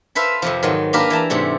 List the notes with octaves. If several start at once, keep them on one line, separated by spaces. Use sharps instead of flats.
A4 B4 C5 E5 F5
F2 C3 F3
G#2 D#3 F#3
A#3 D4 G4 A#4 B4 F5
E3 G5 A5 A#5
G#2 C3 G3 A3